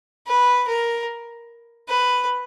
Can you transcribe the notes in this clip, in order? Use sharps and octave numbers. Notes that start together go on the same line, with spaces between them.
B4
A#4
B4